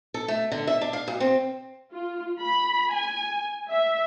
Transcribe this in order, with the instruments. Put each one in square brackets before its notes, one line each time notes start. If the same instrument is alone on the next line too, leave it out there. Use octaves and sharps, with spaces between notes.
[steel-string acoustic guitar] A4
A3
D3
E5
D4
F5
D2
C4
[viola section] F4
B5
G#5
E5